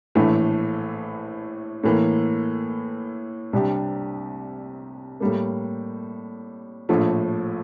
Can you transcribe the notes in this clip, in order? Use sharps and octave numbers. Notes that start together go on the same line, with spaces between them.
A#1 A2 E3 A3
A2 E3 A#3
C2 C3 G3 D4 G4
A2 G3 A#3
A#1 A2 F3 A3